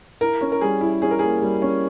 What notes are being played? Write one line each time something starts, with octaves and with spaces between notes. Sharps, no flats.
E4 A#4
C#4
A#4
G3 G#4
E4
C#4 G#4
A#4
A#3 G#4
G3
C#4